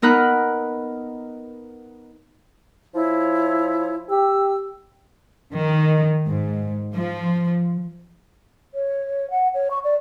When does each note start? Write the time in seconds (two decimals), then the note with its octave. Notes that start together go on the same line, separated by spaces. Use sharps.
0.02 B3 D#4 A#4 B5 F#6
2.94 F3 E4 C#5
4.10 G4 E6
5.53 D#3
6.27 G#2
6.95 F3
8.74 C#5
9.31 F#5
9.54 C#5
9.71 C#6
9.84 D5